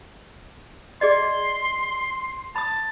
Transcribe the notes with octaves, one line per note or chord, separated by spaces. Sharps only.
G#4 D5 D#5 C6
A5 B5 D#6